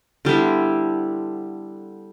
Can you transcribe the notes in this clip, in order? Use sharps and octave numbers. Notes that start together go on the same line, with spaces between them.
D3 G3 B3 E4